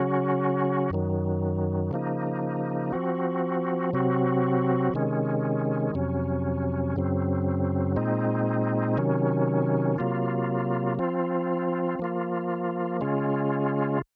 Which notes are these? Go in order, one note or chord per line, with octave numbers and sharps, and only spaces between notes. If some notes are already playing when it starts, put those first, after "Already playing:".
Already playing: C#3 F#3 C#4 F#4
F#2 D#3 F#3
C#3 F3 A#3 D#4
F3 C4 F#4
C3 F#3 C4 F#4
C3 D#3 G#3 C#4
F2 C3 F#3 C#4
F#2 C#3 F#3 C4
A#2 G#3 C4 D#4
C3 D#3 F#3 C#4
C3 F#3 A#3 F4
F3 C4 F4
F3 A#3 F4
C#3 G#3 C#4 F4